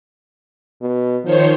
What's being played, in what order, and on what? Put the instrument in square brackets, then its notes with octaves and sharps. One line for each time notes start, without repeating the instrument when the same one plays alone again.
[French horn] B2
[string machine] D#3 C5 C#5 [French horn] F3